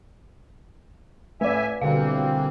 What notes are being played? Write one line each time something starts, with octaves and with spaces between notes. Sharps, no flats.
A2 A3 B4 D5 E5 G#5
B2 D3 E3 G3 A#3 C4 F5